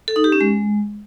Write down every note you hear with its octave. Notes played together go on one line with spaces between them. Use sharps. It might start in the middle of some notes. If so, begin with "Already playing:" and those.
A4
D#4
G4
C#4
G#3